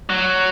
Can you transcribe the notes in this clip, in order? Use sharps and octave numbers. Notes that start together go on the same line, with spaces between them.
F#3